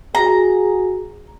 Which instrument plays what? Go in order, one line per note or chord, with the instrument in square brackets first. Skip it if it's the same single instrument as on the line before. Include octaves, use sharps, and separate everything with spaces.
[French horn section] F#4 G#4 [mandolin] A#5